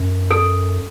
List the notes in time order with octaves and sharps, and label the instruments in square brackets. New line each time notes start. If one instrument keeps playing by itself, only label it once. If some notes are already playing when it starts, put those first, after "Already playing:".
Already playing: [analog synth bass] F#2
[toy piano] A4